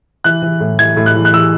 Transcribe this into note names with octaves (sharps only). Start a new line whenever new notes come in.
E3 F#6
E3
A2
E3 G#6
A2
F#6
E3
F#6
E3 E6